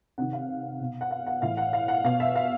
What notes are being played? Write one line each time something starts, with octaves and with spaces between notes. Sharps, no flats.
C3 D#3 F#5
F5
B2
F#5
F5
F#5
A2 E3 F5
F#5
F5
F#5
B2 F5
E5
F5